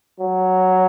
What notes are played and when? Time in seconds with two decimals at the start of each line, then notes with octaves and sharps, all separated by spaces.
0.20 F#3